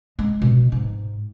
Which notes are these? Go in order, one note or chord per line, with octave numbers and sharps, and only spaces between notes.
G#3
B2
G#2